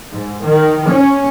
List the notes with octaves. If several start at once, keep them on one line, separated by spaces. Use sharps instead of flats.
G#2
D#3
C#4